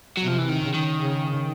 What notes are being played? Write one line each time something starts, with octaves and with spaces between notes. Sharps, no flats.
F#3
C3 F3
E3
D#3
C#3
D#3
C#3